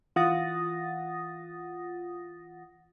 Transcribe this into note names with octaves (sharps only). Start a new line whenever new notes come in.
E3 F4 F#5 D#6 A6 A#6